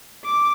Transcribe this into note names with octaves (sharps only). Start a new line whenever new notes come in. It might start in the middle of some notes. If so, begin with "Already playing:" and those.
D6